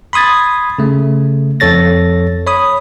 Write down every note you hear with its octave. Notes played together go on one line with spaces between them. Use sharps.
B5 C6 D#6 G#6 A6
C#3 A3
F2 A4 C#5 A6 A#6
C#5 B5 D#6